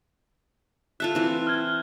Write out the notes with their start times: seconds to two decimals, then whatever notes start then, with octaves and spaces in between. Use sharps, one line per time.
1.00 F4 A4 E5 F#6
1.15 E3 C4
1.47 F6 G#6